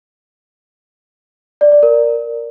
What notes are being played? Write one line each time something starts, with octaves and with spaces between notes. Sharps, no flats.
D5
D5
A#4